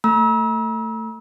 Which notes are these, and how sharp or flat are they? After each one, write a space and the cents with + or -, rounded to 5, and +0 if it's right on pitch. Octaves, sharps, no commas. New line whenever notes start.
A3 +25 A#5 +45 E6 -30